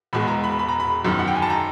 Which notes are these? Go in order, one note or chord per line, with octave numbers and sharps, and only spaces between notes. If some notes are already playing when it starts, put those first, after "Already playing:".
E1 E2 B2 G#3 B5
A#5
B5
B5
A#5
B5
G1 F#2 D#3 F#3
F#5
G5
G#5
A5
A#5